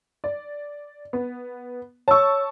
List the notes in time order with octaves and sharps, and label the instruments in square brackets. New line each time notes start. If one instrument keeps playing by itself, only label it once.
[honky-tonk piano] D5
B3
[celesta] C#5 E6 [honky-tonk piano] A5 C#6